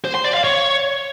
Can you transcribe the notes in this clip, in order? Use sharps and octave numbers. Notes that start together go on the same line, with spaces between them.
C5
C6
D5
F5
C#5